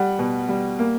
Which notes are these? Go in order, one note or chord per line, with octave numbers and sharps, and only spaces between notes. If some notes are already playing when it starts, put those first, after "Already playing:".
Already playing: G3 F#5
B2
G3
A#3